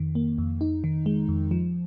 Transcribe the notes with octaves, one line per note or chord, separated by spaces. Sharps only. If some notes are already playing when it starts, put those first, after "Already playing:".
Already playing: F2 D#3
A#3
F2
D#4
D#3
G#3
F2
F3